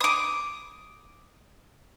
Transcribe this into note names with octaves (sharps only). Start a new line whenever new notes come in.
D6 D#6